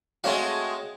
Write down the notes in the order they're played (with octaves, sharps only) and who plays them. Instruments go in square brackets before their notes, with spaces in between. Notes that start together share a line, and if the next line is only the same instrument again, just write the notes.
[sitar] G#3 A3 F#4 [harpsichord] C4 C#5 F5